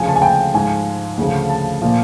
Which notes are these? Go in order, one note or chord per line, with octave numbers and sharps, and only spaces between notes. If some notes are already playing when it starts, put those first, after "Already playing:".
Already playing: D2 C#3 F3 G#5
A5
G#5
G5
G#2 F3 G#5
D2 C#3 F3
A5
A#2 F3